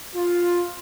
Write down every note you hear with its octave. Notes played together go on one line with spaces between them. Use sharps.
F4